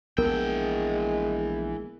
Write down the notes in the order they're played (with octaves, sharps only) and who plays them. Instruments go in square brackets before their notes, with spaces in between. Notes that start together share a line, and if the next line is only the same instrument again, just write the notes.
[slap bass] A#1 B3 [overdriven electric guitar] E3 G5 [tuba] G#3 [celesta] A#4